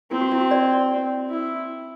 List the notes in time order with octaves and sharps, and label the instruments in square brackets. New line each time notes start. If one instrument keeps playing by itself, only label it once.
[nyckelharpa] C4 [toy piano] E4
[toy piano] F#4
E4
F#4
D5
[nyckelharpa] E4